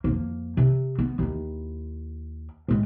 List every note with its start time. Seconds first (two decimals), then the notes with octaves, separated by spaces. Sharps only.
0.04 F2 A#3
0.57 C3
0.99 B3
1.19 D#2 E4
2.68 A2 G#3